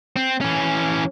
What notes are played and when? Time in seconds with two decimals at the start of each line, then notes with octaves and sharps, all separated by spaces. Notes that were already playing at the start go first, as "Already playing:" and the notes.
0.16 C4
0.41 E3 C#4